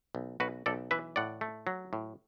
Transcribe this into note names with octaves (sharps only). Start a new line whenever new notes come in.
B1
B1 F#4 B4
B1 A4 D5
E3 B4 E5
A2 D5 F#5
A3
F#3
A2